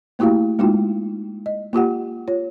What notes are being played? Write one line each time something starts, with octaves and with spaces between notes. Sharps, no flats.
A3 A#3 E4 F#4 G4 F5
G#3 A#3 D#4 F4 F#4 G5
D#5
A#3 F4 G4 F#5
F4 C#5